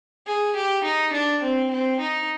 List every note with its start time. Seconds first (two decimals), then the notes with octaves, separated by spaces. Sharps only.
0.27 G#4
0.56 G4
0.84 D#4
1.13 D4
1.42 C4
1.71 C4
2.00 D#4